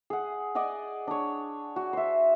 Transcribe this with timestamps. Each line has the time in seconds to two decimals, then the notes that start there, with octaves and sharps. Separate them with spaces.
0.10 G#4 F#5
0.55 D5 D#5 F#5 G#5
1.07 D4 C#5
1.76 F#4
1.93 C5 E5